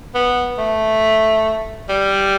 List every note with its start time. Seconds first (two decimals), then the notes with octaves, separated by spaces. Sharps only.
0.15 B3
0.58 A3
1.89 G3